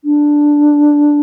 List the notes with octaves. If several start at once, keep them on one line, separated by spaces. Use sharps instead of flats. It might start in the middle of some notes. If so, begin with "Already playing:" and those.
D4